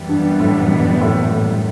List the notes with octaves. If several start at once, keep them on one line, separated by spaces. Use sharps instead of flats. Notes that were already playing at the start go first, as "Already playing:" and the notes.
Already playing: F#2 E3 G3 B3
G2
A2
B2
A2
A2